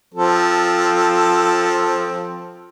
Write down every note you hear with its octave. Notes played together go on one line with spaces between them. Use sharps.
F3 C4 A4